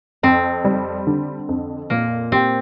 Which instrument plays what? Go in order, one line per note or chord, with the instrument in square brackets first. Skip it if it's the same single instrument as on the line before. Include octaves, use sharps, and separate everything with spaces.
[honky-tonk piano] F2 [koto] C4
[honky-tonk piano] G3
D3
F2
[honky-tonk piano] A#2 [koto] A#3
[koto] C4 [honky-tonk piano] G4